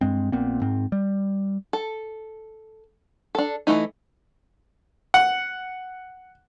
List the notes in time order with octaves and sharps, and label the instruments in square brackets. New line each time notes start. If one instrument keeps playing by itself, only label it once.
[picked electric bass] G2 G#3 C4
A#1 A#2 B3 C4
G#2 C4
G3
[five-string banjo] A4
D4 A4
E3 F#3 A3 D#4
[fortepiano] F#5